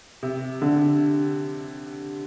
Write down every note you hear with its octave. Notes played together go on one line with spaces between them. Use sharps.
C3
D3